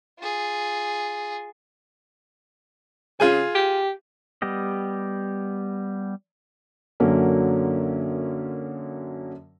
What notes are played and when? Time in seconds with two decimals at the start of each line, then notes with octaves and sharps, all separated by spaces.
0.20 F4 G#4
3.20 C#3 F4 G#4 G#5
3.55 G4
4.42 G3 B3 G4 D#5
7.00 F#2 D3 F#3 A#3 C#4